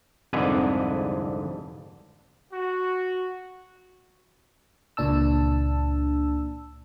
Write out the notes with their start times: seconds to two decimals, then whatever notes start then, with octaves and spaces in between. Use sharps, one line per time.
0.33 C2 F2 G#2 D3 B4 G#5
2.52 F#4
4.97 C#2 A#2 D4 A5 E6